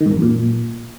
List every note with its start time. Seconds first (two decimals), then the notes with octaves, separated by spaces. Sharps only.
0.01 D#3
0.06 G#2
0.11 E2
0.17 F#2
0.22 A#2